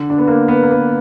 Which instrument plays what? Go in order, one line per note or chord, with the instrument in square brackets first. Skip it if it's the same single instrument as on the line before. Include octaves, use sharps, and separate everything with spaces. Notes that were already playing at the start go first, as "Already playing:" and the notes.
Already playing: [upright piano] D3
D4
B3
A#3
B3
A#3
B3